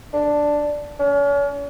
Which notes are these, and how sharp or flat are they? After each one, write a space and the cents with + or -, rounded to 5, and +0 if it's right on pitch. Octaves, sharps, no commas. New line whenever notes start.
D4 +0
C#4 +40